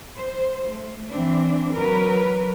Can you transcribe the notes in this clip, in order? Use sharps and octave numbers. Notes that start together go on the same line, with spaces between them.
C5
A3
E3 C4 D4
F#3 A#4 B4